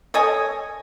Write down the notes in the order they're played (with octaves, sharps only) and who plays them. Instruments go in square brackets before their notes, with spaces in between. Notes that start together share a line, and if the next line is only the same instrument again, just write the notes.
[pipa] A4 C#5 D#5 G#5